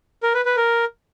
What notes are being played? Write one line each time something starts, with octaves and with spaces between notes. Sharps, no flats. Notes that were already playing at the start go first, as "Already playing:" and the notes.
A#4
B4
B4
A#4